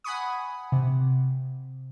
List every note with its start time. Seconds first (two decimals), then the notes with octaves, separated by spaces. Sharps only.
0.04 F#5 G#5 B5 C#6 D#6
0.72 C3